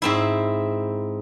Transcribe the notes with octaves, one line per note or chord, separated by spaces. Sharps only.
G#2 C4 E4